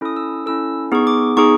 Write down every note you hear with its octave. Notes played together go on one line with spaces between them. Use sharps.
C#4 E4 A4 D#6
E6
C#4 E4 A4 E6
B3 D#4 G#4 C#6
D6
B3 D#4 G#4 C#6